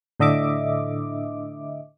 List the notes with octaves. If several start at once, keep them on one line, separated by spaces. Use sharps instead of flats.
A2 D3 D#5 E5 D6